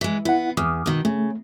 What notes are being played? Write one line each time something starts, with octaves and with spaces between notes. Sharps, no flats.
E3 G#3
B3 E4 F#5
E2 D6 D#6 F6
B2 D#3
C#3 A3